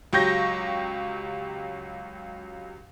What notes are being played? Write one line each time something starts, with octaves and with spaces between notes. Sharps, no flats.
C#2 F#3 G4 C#6 G6 A#6